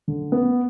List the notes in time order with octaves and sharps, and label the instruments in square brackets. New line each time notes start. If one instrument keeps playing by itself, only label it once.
[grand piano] D3
B3